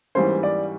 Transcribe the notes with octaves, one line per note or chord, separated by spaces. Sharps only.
G#2 E3 G3 A#3 C#4 C5
D5